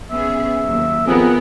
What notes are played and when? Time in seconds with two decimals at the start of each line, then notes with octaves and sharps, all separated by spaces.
0.11 B3 C#4 G#4 E5
0.65 D#2 F#3
1.07 F2 B3 G#4 A#4